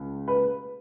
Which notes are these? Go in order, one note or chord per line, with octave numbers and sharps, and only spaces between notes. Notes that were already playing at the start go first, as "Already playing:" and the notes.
Already playing: C#2
B4